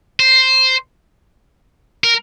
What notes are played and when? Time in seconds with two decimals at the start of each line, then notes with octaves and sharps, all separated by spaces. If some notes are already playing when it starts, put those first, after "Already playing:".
0.20 C5
2.04 A#4